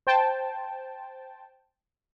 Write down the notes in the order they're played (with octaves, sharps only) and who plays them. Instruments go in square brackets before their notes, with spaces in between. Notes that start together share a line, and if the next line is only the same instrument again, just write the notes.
[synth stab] C5 G5 A5